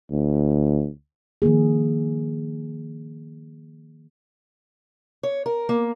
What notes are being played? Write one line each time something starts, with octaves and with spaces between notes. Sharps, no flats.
D2
D#3 F3 A#3 G#4
C#5
A#4
A#3